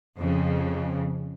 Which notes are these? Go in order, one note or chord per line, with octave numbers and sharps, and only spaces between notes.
F2 C#3